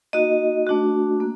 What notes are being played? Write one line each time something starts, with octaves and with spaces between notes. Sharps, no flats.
A#3 D#4 F#4 D#5
A3 D4 F#4
A#3